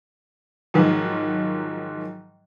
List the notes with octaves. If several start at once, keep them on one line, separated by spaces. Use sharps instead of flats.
G#2 D#3 F3 F#3